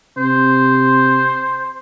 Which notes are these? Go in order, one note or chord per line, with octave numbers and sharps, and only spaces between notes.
C3 C5